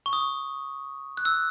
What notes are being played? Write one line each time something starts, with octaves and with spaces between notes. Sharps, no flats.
C#6
D#6
F#6
E6